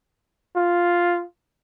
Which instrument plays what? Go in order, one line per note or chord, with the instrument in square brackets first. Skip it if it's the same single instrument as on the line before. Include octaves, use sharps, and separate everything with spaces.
[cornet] F4